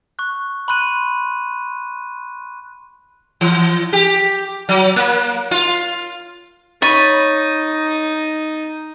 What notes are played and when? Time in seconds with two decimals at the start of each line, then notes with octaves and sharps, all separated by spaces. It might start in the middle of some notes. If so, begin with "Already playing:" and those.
0.19 C#6 F#6
0.68 B5 C6 F#6 D#7
3.41 E3
3.93 G4
4.69 F#3
4.96 A#3
5.51 F4
6.82 D#4 C#5 B5 A6 D#7